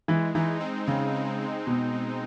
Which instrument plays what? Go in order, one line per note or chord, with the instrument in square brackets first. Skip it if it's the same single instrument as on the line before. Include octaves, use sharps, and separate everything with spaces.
[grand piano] E3 [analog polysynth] G#3
[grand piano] E3 [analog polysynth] D#4
[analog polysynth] C4
[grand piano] C#3 [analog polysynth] D#4
[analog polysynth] C4
C4
[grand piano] B2 [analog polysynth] G#3
[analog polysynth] G#3